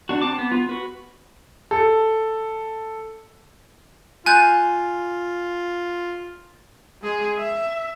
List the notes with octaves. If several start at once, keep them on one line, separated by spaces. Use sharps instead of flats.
D4 F#4
C4 A5 D6
B3
B3 F4
F#4 B4
A4
F4 G#5 F#6 G6
G#3 G#4
E5